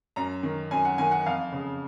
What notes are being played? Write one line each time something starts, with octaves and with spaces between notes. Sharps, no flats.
F#2 A#5
D#3
F#2 G#5
F#5
D#3 G#5
F#5
F2 F5
C#3